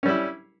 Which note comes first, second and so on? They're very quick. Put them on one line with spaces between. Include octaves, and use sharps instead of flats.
C#4 G3 E4